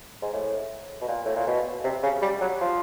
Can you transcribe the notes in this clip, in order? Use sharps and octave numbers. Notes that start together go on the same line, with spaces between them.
G#2
A2
B2
A#2
A2
A#2
B2
C3
C#3
G3
F#3
F3